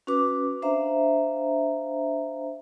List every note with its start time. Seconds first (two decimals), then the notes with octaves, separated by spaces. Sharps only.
0.07 C#4 F#4 B4 D6
0.62 D4 C5 E5 F5 A#5